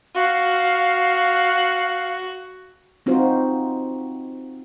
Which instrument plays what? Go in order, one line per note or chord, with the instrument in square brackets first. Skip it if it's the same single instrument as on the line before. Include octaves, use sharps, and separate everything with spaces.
[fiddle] F#4 [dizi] F5
[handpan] C4 D#4 F4 F#4 C5